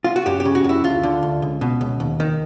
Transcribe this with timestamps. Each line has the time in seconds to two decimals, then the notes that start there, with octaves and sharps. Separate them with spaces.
0.04 F4
0.16 F#4
0.26 F#2 G4
0.40 G4
0.45 C#3
0.55 F#4
0.64 F#2 E4
0.84 D2 F4
1.03 D3
1.23 D2
1.42 C#2
1.61 B2
1.81 C#2
2.00 D#2
2.20 D#3